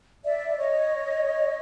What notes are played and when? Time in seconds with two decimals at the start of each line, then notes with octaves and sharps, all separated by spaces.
0.24 D5 E5
0.59 C#5 D#5